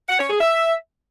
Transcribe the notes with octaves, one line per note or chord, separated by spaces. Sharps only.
F#5
C#5
G#4
E5